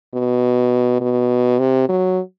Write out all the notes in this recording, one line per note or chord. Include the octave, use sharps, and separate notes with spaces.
B2
B2
C3
F#3